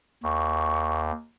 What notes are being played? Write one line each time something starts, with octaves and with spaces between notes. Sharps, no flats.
D#2 C#6